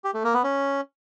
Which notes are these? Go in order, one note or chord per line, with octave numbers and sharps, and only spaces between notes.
G4
A3
A#3
B3
C#4